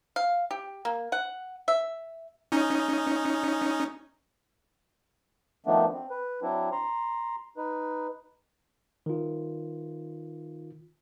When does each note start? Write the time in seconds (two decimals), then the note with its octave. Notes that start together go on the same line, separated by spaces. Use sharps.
0.16 F5
0.51 G4
0.85 A#3
1.12 F#5
1.68 E5
2.52 C#4 D#4
5.66 D#3 F3 A3 B3 D4
5.92 C4
6.10 B4
6.42 F#3 C4 D4 E4
6.72 A#5 C6
7.57 D#4 B4
9.06 D#3 F4